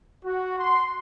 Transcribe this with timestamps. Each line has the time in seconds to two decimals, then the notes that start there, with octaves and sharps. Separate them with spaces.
0.24 F#4
0.57 C6